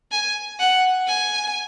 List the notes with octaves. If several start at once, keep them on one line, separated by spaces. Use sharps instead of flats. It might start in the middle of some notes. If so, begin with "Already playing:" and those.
G#5
F#5
G#5